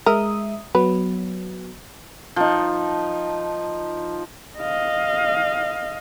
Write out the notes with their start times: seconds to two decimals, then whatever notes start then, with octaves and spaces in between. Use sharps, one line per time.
0.06 G#3 A#4 E5 D#6
0.75 F#3 B3 B4
2.36 F3 D#4
4.58 D#5 F5